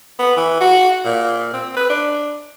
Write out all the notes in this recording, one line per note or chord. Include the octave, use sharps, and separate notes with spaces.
B3
E3
F#4
A#2
C4
B4
D4